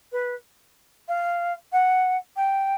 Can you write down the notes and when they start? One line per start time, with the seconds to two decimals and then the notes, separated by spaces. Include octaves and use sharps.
0.12 B4
1.08 F5
1.72 F#5
2.36 G5